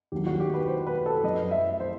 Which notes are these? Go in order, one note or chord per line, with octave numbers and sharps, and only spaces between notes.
D#2 D#3 F#3 G4
F#4
G4
B4
C5
B4
A4
F#2 F#3 D#5
E5
C5